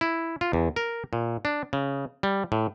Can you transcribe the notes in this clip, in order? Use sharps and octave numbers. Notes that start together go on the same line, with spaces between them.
E4
F4
E2
A#4
A#2
D4
C#3
G3
A2